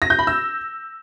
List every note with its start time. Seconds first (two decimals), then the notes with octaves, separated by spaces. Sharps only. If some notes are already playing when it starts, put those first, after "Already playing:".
0.02 A#6
0.10 G6
0.19 B5
0.27 E6